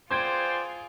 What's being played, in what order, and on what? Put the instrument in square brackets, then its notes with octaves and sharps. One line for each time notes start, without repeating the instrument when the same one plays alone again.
[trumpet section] B3 D5 G5 [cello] F4 G#4 [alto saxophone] C5 [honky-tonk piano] C6 G#6